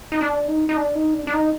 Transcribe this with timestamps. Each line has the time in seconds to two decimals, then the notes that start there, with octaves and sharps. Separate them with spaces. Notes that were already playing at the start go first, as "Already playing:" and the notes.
0.12 D#4
0.21 D4
0.48 D#4
0.69 D#4
0.77 D4
0.95 D#4
1.14 D4
1.27 D4
1.33 D#4